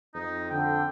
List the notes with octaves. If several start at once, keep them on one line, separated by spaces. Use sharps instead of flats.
F2 D#4
D3 G5